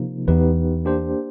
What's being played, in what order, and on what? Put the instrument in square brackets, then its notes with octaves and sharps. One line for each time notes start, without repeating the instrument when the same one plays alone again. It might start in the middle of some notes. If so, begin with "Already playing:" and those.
Already playing: [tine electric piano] C3 F3 A#3 D#4
[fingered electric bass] E2 [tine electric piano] B3 D#4 G4 B4
[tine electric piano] A#3 D4 G4 C5